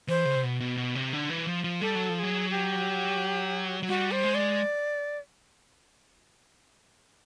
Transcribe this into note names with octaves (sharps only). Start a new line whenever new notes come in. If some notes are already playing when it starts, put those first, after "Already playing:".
E3 C5
C#3
C3
B2
B2
B2
C3
D3
E3
F3
F3
G3 A4
F#3
F3
A4
F#3 G#4
G4
F#3
G3 F#4
C5
G#3
D5